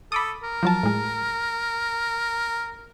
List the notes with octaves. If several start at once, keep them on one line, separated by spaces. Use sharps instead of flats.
A4 B5 D6 D#6
A#4
F3 F#3 A5
A2 G#3